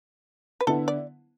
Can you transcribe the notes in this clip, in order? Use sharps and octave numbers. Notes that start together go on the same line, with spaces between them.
B4
D3 B3 E4 A4
D5